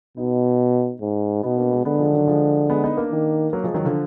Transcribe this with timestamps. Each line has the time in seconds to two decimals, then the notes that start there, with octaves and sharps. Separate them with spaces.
0.17 B2 B3 D#4
1.01 G#2
1.43 B2 B3 D#4
1.57 A#3 D4
1.71 G#3 B3
1.85 D3 G#3 B3
1.99 F3 G#3
2.13 D#3 F#3
2.27 F3 G#3
2.70 G#3 B3
2.84 B3 D#4
2.97 A#3 D4
3.12 D#3
3.53 F#3 A#3
3.64 F3 G#3
3.74 D#3 F#3
3.85 D3 F3